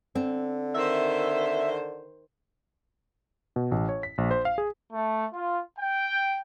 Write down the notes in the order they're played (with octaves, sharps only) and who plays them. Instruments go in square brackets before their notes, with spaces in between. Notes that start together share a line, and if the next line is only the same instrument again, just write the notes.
[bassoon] D3 [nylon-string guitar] C4
[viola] D#3 C5 [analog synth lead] E5
[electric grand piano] B2
A1
C#5
B6
A#1
C5
F5
G#4
[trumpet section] A3
F4
G5